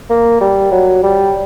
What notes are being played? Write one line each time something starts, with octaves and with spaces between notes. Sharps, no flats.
A#3
G3
F#3
G3